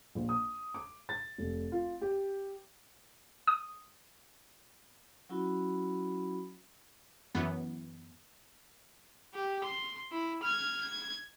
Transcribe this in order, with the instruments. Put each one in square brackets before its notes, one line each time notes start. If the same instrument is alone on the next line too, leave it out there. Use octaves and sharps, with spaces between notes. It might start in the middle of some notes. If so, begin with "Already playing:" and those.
[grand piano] A#1
D#6
D6
A6
F1
F4
G4
[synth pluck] D#6
[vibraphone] F#3 C#4 E4 F#4 B5
[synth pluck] F#2 E3 B3
[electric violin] G4
C6
E4
F6 G#6
G#6